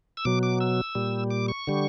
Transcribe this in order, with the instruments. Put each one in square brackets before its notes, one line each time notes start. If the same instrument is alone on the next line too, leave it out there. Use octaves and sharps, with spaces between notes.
[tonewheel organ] E6
B2 F#3 D6
D6
E6
A#2 G3
D6
C#6
D3 G3